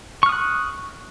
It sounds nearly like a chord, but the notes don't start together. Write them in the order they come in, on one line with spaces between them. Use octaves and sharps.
C#6 F6 D#6 F#6